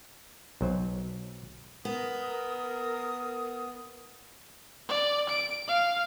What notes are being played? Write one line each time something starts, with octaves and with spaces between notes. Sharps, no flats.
B1 F#3 C5
B3 A#4 D#6
D5
D7
F5